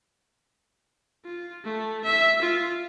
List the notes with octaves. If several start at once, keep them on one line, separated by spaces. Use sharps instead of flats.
F4
A3
E5
F4